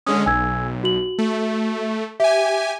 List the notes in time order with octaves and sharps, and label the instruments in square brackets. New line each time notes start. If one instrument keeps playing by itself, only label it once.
[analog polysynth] D3 G#3 C#4 [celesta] D#6
[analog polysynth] B1 [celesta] G#5 E6 G#6
[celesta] F#4 F#7
[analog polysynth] A3
[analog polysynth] G4 G#5 [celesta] E5